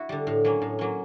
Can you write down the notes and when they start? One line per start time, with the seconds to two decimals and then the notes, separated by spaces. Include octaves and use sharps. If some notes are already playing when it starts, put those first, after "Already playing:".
Already playing: E4 F#4
0.09 D3 G3
0.27 A2
0.44 F#3 A#3 C#4
0.62 A2
0.79 F#3 A#3 C#4